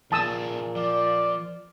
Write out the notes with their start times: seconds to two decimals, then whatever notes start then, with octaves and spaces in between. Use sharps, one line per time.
0.12 A#2 F3 G#4 A5 D#6 E6
0.76 F3 D5